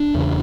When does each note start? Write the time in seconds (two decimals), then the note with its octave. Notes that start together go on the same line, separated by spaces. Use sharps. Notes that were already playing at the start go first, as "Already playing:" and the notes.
Already playing: D4
0.15 E2 C#3